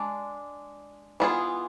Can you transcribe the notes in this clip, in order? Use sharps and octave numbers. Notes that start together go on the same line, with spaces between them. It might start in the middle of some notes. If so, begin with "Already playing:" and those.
Already playing: G#3 D4
E3 B3 F4 G#4